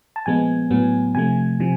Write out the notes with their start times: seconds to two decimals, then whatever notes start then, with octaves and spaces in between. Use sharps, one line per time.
0.16 A5
0.26 A#2 F3 G#3 B3 G#5
0.70 A2 F#3 B3
1.15 C3 F3 A3 G#5
1.60 C3 F3